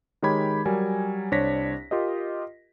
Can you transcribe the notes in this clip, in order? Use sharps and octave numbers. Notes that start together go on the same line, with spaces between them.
D#3 G#3 G4 C#5 B5 G#6
F#3 G3 A#4 G#5
C2 D4 C5 C#5 A#6 B6
F4 G4 A#4 D#5